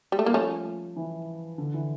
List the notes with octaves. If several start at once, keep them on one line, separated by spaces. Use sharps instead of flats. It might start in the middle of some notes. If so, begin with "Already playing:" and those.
G3
A3
G3 A#3
F3 A3 C#4
E3
D3
E3